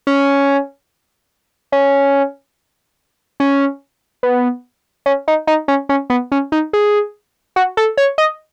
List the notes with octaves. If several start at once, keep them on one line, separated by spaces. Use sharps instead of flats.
C#4
C#4
C#4
B3
C#4
D#4
D#4
C#4
C#4
B3
C#4
D#4
G#4
F#4
A4
C#5
D#5